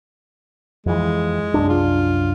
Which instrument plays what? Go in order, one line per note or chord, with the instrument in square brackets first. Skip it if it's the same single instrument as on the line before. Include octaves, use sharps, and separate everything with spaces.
[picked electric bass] F2 E3 [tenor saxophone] G#3
[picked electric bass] C2 F#2 D4
[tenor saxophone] F4